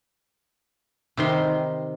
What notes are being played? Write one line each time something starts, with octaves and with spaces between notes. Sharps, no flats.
C3 D#3 C6